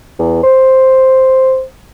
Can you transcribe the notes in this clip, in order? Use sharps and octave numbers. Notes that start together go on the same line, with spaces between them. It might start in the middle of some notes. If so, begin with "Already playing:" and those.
E2
C5